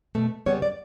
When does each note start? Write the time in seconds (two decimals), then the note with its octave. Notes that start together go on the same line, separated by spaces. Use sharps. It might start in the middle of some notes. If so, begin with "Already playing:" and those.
0.15 B2 A3
0.46 C#3 G3 B3 C#5
0.62 D5